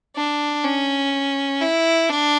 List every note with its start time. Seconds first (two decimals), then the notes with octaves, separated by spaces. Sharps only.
0.16 D4
0.64 C#4
1.61 E4
2.09 D4